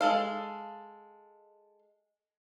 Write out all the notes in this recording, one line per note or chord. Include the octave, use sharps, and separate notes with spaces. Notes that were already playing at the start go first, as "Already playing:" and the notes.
G#3 A4 F5